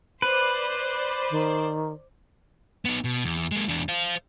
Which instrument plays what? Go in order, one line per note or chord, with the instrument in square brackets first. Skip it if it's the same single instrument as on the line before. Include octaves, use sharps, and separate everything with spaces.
[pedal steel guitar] B4 [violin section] C5 D5
[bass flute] D#3
[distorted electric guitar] B3 D#4
B2
E2
G#3 A#3
E2 D4
C5 F5